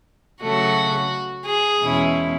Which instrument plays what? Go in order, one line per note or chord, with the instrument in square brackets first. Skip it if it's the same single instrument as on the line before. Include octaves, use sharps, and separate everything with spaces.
[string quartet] C#3 F#3 A3 [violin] F#4
[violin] G#4
[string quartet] E2 B2 G#3 C#4 E4